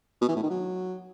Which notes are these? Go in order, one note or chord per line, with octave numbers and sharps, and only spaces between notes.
B2
E3
A2
D#3
F#3